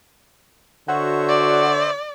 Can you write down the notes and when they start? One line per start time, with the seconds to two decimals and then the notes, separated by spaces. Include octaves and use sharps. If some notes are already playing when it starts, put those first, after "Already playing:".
0.88 D3 F#4 C5 C#5 E5
1.29 D5